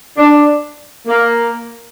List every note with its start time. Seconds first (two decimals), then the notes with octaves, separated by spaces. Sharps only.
0.17 D4
1.07 A#3